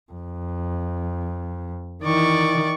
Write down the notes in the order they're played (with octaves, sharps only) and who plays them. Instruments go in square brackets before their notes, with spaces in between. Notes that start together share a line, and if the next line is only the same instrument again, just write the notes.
[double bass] F2
[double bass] D#3 E3 [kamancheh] D5 C#6